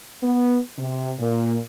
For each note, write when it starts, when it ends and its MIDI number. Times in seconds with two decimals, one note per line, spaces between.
0.23 0.58 59
0.78 1.12 48
1.20 1.58 46